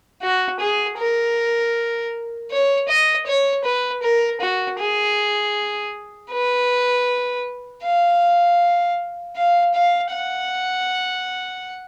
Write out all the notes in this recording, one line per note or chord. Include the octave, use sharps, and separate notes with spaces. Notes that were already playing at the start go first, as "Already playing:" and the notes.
F#4
G#4
A#4
C#5
D#5
C#5
B4
A#4
F#4
G#4
B4
F5
F5
F5
F#5